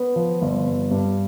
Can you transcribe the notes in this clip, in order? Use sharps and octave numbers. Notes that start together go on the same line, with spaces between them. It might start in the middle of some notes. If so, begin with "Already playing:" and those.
Already playing: B3
F3
G1
G2
G2